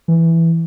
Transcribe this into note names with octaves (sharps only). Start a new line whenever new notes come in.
E3